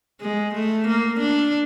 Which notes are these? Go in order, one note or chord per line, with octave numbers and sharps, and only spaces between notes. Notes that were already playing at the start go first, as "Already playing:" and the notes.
G#3
A3
A#3
D4